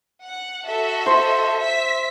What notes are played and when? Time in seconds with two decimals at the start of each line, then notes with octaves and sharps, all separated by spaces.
0.25 F#5
0.65 F#4 A4 E5
1.06 C5
1.60 E5 B6